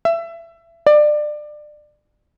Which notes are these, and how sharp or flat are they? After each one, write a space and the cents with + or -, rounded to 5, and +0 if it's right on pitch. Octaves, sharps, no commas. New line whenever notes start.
E5 +25
D5 +25